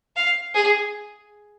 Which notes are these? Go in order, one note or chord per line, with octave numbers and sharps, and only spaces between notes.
F5
G#4